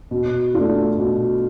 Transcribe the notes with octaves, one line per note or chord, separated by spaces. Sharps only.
B2
A3 D4 F4
B2